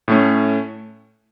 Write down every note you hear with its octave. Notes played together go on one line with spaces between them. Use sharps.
A2 A3 C#4